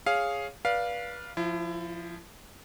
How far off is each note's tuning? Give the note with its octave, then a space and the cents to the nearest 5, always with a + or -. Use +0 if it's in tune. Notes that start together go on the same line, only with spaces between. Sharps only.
G#4 +0 C#5 +0 F5 +0
B4 -25 D5 +0 F5 +0
F3 +0 E4 +30